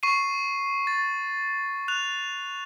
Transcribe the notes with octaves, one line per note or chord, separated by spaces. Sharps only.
C#6 C7 D#7
A6
F#6 F7